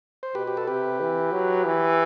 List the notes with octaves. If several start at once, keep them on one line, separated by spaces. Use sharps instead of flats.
C5
B2 G4 B4
G4
A4
C3 G4 B4
E3
F#3
E3